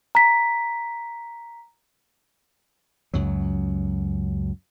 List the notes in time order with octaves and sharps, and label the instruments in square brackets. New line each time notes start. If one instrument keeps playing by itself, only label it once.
[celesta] A#5 B6
[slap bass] C#2 F#2 F#3